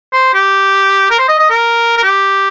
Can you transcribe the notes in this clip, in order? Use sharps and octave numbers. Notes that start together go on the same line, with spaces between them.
C5
G4
A#4
C5
D#5
D#5
A#4
A#4
G4